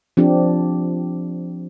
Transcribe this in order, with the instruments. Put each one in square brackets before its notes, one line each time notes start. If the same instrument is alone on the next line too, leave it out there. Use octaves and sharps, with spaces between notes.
[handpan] F3 C4 D4 G4